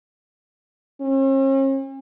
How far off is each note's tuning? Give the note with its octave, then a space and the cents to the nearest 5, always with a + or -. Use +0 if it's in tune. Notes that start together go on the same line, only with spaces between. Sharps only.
C#4 -45